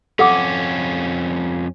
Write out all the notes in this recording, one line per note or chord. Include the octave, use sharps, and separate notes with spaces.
F2 C#4 A4 F#5 D6